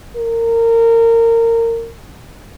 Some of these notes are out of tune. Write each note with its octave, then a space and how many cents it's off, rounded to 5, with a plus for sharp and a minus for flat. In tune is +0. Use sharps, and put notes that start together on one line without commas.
A#4 -25